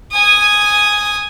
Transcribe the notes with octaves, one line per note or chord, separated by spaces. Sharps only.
G#5 D#6